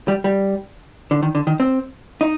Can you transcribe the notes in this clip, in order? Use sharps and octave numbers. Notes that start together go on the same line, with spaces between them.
G3
G3
D3
D#3
D3
D#3
C4
D#4